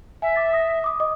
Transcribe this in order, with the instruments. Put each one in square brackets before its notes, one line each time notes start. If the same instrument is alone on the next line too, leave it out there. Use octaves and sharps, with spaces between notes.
[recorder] E5 [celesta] G#5
[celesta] D6 A6
D#6 A#6
D6 D#6
D#5 D6 D#6